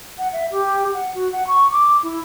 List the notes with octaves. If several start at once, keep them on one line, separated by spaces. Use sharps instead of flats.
F#5
E5
G4
F#5
F#4
F#5
C#6
D6
E4